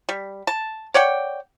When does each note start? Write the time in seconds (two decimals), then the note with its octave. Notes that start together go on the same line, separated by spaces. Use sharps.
0.09 G3
0.47 A5
0.94 C#5 D5 F#5 G5